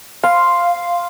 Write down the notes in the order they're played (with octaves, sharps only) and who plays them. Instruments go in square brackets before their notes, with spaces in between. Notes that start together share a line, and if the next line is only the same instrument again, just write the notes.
[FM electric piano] F5 [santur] C6